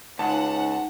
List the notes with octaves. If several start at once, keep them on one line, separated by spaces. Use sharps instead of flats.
C#2 D#4 C5 F#5 G#5 A5